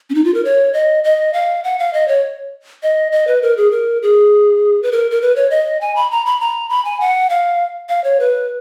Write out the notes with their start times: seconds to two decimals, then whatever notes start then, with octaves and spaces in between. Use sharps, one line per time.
0.10 C#4
0.15 D#4
0.24 F4
0.34 A#4
0.45 C#5
0.74 D#5
1.04 D#5
1.34 F5
1.64 F#5
1.79 F5
1.93 D#5
2.08 C#5
2.83 D#5
3.12 D#5
3.27 B4
3.42 A#4
3.57 G#4
3.71 A#4
4.02 G#4
4.83 B4
4.92 A#4
5.11 A#4
5.22 B4
5.36 C#5
5.50 D#5
5.81 G#5
5.96 B5
6.11 A#5
6.26 B5
6.40 A#5
6.69 B5
6.85 G#5
7.01 F#5
7.30 F5
7.89 F5
8.04 C#5
8.20 B4